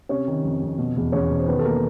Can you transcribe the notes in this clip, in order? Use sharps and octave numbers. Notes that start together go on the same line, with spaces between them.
C3 C#4 C#5
D#3
F2
F2
B2
E2
E2 C#4 C#5
B2
C5
D#3 B3 B4
A4
A#3 A#4